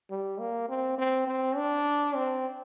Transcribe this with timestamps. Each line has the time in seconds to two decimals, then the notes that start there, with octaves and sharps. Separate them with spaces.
0.10 G3
0.40 A#3
0.69 C4
0.98 C4
1.27 C4
1.57 D4
2.16 C4